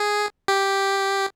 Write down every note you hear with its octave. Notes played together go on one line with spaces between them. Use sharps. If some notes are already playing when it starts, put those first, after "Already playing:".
Already playing: G#4
G4